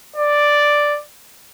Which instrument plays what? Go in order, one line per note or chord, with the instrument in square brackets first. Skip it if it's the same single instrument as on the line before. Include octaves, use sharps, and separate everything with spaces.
[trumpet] D5